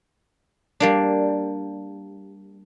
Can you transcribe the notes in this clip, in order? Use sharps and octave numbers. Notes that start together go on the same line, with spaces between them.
G3 A#3 D4